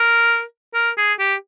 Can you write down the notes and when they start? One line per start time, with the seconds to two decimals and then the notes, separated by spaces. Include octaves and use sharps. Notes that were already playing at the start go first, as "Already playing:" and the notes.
Already playing: A#4
0.74 A#4
0.97 G#4
1.19 G4